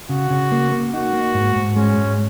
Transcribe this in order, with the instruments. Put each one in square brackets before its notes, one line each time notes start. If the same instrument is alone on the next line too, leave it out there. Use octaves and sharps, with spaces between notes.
[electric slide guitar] C#3 [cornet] F#4
[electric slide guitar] C#3
A#3
A#3
[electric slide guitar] D#4 [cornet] F#4
[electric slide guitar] A#3
G#2
G#2
[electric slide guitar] G#3 [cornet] C#4
[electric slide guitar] G#2